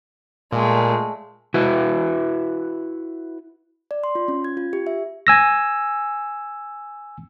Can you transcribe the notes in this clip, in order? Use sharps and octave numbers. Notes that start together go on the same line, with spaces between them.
A#2 G#3 A3
E4 F#4 B4 E5
D5
C6
F4
C#4
G#6
F4
G4
E5
G#5 E6 A#6